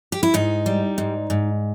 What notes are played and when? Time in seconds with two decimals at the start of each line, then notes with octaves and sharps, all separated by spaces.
0.12 G4
0.23 E4
0.34 G#2 D#4
0.66 G3
0.98 G#2
1.30 G#2